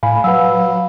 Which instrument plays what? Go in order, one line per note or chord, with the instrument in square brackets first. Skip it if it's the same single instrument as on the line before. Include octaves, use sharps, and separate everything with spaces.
[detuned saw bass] A2 [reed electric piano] F5 B5 [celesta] G#5
[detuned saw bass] F#3 [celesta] B4 F#5 E6 [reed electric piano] F5 B5